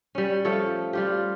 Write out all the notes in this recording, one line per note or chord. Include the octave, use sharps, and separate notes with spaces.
G3 C#4
F3 A3 A4 C#5
G3 F4 G4